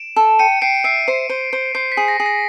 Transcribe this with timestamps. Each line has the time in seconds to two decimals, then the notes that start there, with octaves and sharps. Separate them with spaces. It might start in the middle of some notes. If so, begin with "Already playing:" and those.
Already playing: D7 E7
0.16 A4
0.39 G5 C#7 D#7
0.62 G5 C7 D7
0.84 E5 C7 D7
1.08 C5
1.29 C5
1.53 C5
1.75 C5 C7
1.92 B6
1.97 G#4
2.08 A#6
2.20 G#4
2.26 A#6